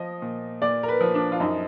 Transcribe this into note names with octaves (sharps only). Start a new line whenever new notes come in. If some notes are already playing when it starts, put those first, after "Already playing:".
Already playing: F3 D#5
A#2
A#2 D5
A#4
B4
F3
D4
F4
F#2 D#4